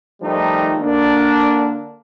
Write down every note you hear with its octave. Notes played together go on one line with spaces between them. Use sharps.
D#3 F3 G3 A3 D#4
D3 A#3 D4